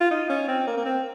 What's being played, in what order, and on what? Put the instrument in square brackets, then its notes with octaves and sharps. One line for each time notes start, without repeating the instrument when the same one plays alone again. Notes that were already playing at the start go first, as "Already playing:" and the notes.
[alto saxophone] F4
D#4
C#4
C4
A#3
A#3
C4